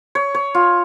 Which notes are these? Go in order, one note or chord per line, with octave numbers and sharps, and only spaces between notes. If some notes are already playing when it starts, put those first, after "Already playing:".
C#5
C#5
F4